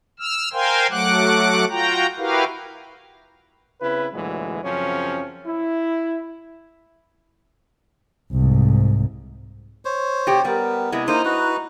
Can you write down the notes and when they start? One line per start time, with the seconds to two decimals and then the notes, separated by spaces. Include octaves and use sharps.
0.19 E6 F6
0.53 A#4 C5 F5 G5 G#5 C6
0.91 F#3 A3 F#5 D6 F#6
1.70 F4 F#4 G5 A#5
2.18 E4 F#4 G4 A#4 B4 F5
3.82 C#3 C4 E4 B4
4.14 D2 A#2 E3 F#3 G#3
4.64 F#2 C#3 F3 C4 C#4
5.46 E4
8.32 C2 G#2
9.85 C5 C#5
10.27 B2 G4
10.45 G3 B3 A#4
10.92 C3 G#3 E4
11.08 A#3 D#4 C5
11.25 F#4 B4